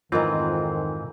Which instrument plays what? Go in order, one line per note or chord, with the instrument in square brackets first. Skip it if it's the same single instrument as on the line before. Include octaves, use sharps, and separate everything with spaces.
[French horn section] F2 D#3 [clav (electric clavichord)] G#2 E3 C4 [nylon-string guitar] F4 A#4 D#5